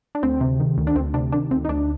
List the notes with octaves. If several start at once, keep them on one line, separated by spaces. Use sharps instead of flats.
D4
D2 C4
C3
D#3
D2
D4
D2 C4
C3 D4
D#3 D4
D2 C4
D#4
D2 D4